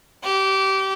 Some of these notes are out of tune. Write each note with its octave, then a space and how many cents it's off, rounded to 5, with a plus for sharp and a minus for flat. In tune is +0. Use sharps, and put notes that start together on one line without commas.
G4 -25